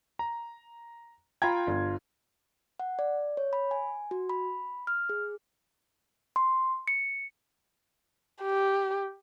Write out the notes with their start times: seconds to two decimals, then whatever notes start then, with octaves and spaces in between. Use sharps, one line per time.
0.19 A#5
1.42 F4 G5 A#5 B5 G#6
1.67 G1
2.80 F#5
2.99 D5
3.37 C#5
3.53 B5
3.71 G#5
4.11 F#4
4.29 B5
4.87 F6
5.09 G#4
6.36 C6
6.88 C#7
8.42 G4